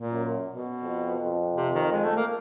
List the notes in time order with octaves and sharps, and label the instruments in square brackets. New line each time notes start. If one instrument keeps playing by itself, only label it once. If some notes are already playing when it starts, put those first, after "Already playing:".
Already playing: [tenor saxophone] A#2
[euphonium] F#2
[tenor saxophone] B2
[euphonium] F2
F2
[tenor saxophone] C3
D#3
G#3
A3
A#3